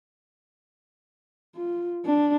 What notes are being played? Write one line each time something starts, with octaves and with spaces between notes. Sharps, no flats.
F4
D4